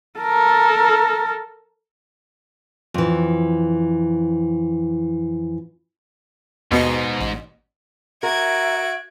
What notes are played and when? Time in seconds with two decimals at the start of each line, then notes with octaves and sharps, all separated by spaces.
0.20 A4 A#4
2.94 F2 E3
6.72 D#2 G#2 B2 B3 D#5
7.20 A1
8.23 F#4 A#4 E5 G#6 D7